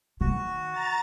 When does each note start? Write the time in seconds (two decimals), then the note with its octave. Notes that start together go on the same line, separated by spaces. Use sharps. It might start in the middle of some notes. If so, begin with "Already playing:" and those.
0.21 D#3 F#4
0.71 A#5 A6